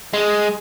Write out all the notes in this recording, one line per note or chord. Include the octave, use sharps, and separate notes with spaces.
G#3